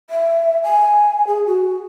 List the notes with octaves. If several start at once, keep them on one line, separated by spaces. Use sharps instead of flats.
E5
G#5
G#4
F#4